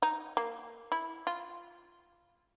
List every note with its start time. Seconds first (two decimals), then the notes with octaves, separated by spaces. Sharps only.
0.02 D#4
0.37 A#3
0.92 E4
1.27 F4